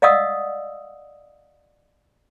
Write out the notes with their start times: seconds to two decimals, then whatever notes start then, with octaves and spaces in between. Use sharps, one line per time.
0.02 D5 D#5 F5 F#5 D#6 E6